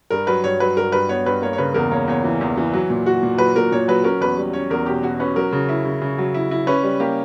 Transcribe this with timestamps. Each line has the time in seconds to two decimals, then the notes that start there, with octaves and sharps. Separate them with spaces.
0.10 G2 A#4
0.27 F#3 B4
0.44 G2 C#5
0.60 F#3 B4
0.77 G2 A#4
0.92 G2 B4
1.09 B3 C#5
1.26 G2 B4
1.42 A#3 C#5
1.53 C#5
1.58 C#3 B4
1.74 E2 A#4
1.91 A#3 C#5
2.08 E2 C#5
2.24 E3
2.41 E2
2.57 E3
2.73 F#3
2.90 A#2
3.06 F#4
3.23 A#2
3.38 F#3 B4
3.55 A#2 A#4
3.72 A#2 C#5
3.88 F#3 B4
4.04 C#4 A#4
4.20 E2 B4
4.37 G3
4.53 C#4 C#5
4.70 E2 A#4
4.86 B2 G4
5.03 B2 F#4
5.20 C#4 B4
5.36 F#3 A#4
5.52 C#3
5.69 E4
5.85 C#3
6.02 C#3
6.18 F#3
6.34 E4
6.51 E4
6.67 C#4 B4
6.83 G3
7.00 A#3 G4